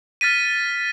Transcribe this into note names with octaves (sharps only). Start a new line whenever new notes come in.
F6 A6 B6 D#7